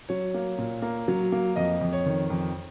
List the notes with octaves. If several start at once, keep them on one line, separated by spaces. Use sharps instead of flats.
F#3 C#5
A#3
A#2
A#3
F#3
A#3
F2 D#5
F2
C#5
D#3
F2